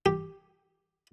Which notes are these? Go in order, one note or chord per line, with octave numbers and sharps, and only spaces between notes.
G4